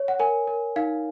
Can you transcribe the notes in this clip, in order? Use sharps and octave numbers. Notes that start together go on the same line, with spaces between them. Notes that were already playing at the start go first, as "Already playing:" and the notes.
Already playing: C#5
F#5
A#4 G#5
A#4
D#4 F5